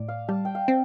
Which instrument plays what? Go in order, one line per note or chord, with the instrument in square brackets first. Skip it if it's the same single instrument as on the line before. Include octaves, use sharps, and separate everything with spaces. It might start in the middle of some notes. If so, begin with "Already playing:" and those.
Already playing: [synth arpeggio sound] A2 [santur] D5
[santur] F5
[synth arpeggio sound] G3 [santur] A5
[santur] G5
F5
[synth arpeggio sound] C4